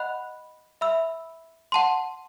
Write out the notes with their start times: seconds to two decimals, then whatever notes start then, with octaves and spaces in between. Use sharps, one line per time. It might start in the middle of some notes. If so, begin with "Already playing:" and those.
Already playing: D#5 F#5 B5 F#6
0.81 E5 B5 E6
1.72 F#5 A5 C6